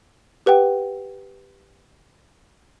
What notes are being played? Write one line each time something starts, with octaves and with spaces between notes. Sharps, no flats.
G4 B4 F#5 G5